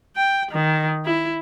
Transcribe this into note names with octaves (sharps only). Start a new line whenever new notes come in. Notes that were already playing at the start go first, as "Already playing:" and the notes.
G5
D#3
E4